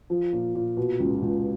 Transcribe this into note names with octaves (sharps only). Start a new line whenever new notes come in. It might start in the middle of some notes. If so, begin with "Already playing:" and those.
F3
A#2
A#2
B2
C#2
C#2